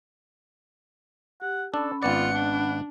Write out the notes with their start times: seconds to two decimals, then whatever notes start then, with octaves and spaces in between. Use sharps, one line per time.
1.42 G4 F#5
1.74 C#4 D4 A4 B5
2.03 G#1 B3 F4 D5 F#5 C#7
2.33 D4